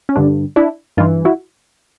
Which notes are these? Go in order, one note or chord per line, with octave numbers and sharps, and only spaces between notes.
C#4
G2 D3 D4
D4 E4
G2 E3 D#4 F4
E4 F#4